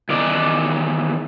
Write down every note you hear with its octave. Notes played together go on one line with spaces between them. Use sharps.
E2 D#3 D5